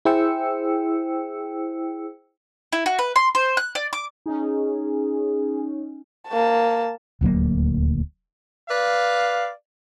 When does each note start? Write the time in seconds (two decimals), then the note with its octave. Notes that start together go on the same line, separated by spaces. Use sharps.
0.05 E4 G#4 C5 G5 E6 C#7
2.73 E4
2.86 F#4
2.99 B4
3.16 C6
3.35 C5
3.57 F#6
3.75 D5
3.93 D6
4.26 C#4 D#4 G#4
6.28 A#3 A5
7.21 D#1 D2 F#3 A#3
8.69 B4 D5 F5